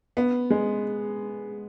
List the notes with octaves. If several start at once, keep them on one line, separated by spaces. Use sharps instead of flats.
B3
G#3